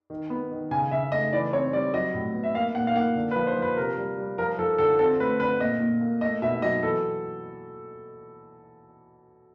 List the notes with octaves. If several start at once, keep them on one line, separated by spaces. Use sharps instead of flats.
D#3
B3
D#3
C#3 G#5
C#3 E5
A3 D#5
E3 D5
C4 C#5
G3 D5
F#3 D#5
A2
B3
E5
A#3 F5
A#2 F#5
F5
A#3 F#5
D3
B4
F3
C5
F3
B4
C3 A#4
G3
G3
F3 A#4
F3 A4
D3 A4
C4 A4
A3 B4
D3 B4
A#2 D#5
A#2
A#3
A3 D#5
B2 E5
F#3 D#5
E3 A4